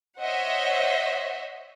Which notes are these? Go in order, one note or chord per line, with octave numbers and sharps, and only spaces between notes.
C5 C#5 D#5 E5 F#5